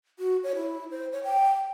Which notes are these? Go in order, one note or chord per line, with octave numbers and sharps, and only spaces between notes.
F#4
C#5
E4
C5
C#5
G5